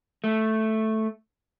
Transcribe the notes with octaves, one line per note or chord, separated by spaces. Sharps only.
A3